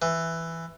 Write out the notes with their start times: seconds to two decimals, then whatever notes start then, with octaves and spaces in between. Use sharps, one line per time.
0.02 E3